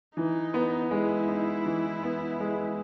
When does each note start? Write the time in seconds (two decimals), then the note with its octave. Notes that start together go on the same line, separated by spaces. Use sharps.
0.16 E3 D#4
0.54 B3
0.91 G#3 E4
1.28 D#4
1.66 E3
2.03 B3
2.40 G#3